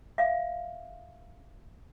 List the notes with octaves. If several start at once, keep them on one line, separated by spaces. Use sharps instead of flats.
E5 F5